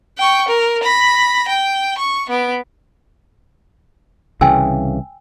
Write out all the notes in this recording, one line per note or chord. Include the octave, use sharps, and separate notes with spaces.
G5 C#6
A#4
B5 A#6
G5
C#6
B3 D7
C2 C#3 E3 G5 G#5 E6